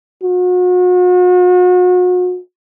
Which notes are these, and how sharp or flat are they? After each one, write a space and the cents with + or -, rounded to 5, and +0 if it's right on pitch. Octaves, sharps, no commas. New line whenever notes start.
F#4 -40